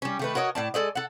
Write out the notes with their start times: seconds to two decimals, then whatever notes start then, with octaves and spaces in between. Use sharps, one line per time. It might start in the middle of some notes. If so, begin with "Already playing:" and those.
0.02 G3 C#4
0.19 D#3 A3 B4
0.35 F#4 A#4 C#5 D#5
0.55 A2 D5 A5
0.74 G#3 A4 D5 D#5
0.95 A4 F#5